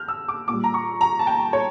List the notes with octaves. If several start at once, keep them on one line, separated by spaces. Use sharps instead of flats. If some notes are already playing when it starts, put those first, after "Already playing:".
Already playing: F6 G6
E6
D6
A#2 G3 D6
A#5
C#6
A#5
A5
G5
C#5